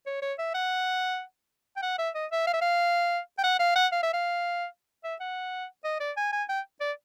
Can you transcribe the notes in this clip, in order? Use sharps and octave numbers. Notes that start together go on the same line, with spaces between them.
C#5
C#5
E5
F#5
G5
F#5
E5
D#5
E5
F5
E5
F5
G5
F#5
F5
F#5
F5
E5
F5
E5
F#5
D#5
D5
G#5
G#5
G5
D5